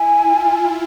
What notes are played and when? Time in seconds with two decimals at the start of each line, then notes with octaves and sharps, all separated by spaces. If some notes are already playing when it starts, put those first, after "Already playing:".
Already playing: E4 G#5
0.21 F4